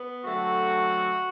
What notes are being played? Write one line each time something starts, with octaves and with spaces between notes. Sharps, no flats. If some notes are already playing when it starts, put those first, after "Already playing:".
Already playing: B3
D3 F#3 A3 C4 F#4